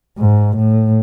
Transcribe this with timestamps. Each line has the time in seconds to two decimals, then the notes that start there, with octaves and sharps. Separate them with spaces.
0.18 G#2
0.57 A2